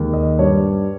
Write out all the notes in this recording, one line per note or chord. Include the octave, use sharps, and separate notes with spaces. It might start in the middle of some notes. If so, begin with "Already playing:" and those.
Already playing: D#2 D#3 G#3
D#5
G2 G3 C#5